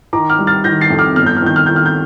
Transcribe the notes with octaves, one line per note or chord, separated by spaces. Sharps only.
D#3 A#5 D6
D6 F6
G3
F6 A6
D#3 G6 A#6
A6 C7
F2
D6 F6
G1 F6
G6
F6
D#3 G6
F6
D#3 G6
F6
G6